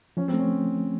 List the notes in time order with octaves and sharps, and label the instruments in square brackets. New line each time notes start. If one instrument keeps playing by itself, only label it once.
[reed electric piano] F3 [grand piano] C#4
[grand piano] C4
[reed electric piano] A3
[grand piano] C#4